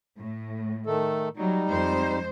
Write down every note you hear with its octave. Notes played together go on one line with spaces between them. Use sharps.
A2
D#3 A3 A4
F#3 G3 D#4
F2 G#3 C5